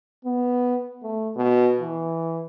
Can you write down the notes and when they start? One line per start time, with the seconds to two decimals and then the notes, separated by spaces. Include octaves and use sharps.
0.25 B3
1.03 A3
1.36 B2
1.80 E3